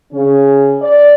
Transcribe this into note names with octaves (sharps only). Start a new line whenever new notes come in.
C#3 C#4
D5